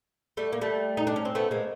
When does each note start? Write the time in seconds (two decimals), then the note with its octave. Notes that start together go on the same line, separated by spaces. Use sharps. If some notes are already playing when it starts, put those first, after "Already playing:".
0.37 G3 A3
0.53 A#3
0.61 G3 A3
0.97 D#4
1.07 D4
1.16 C#4
1.25 C4
1.35 A3 B3
1.51 G#3 A#3